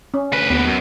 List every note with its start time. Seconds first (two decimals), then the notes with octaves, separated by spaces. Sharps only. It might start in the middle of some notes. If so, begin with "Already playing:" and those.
0.14 C#4
0.32 D2 B4
0.50 D#2 B3
0.67 F#2